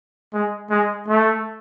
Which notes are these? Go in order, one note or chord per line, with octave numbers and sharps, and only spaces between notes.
G#3
G#3
A3